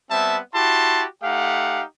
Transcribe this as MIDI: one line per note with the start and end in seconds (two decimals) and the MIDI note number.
0.11 0.40 55
0.11 0.40 59
0.11 0.40 60
0.11 0.40 76
0.11 0.40 81
0.55 1.05 64
0.55 1.05 66
0.55 1.05 67
0.55 1.05 81
0.55 1.05 84
1.23 1.83 57
1.23 1.83 63
1.23 1.83 67
1.23 1.83 77
1.23 1.83 78